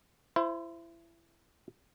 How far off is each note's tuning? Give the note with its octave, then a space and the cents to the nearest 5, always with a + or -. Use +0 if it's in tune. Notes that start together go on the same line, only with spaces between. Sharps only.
E4 +25 C5 -10